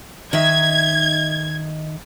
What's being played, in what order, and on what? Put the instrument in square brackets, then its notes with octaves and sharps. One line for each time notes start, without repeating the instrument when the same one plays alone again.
[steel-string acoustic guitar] D#3 D#4 E5 [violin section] G#6